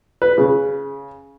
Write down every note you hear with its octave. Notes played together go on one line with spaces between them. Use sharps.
B4
C#3